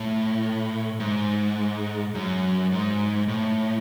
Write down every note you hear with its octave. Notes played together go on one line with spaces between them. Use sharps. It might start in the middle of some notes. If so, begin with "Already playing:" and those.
Already playing: A2
G#2
F#2
G#2
A2